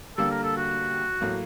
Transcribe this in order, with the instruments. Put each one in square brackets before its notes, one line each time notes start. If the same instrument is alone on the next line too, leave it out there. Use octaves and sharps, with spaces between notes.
[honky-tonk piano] D3 G3 A#3 [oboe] A4
[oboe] A#4
A4
F#4
[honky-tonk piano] A2 F#3 A#3